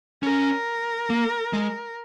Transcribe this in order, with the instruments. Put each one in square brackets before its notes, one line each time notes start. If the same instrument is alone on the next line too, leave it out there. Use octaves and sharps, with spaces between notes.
[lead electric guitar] C#4 [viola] A#4
[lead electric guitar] A#3
G#3